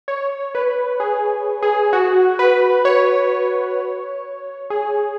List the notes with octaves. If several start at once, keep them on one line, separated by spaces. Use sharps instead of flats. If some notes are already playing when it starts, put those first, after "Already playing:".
C#5
B4
G#4
G#4
F#4
B4
C#5
G#4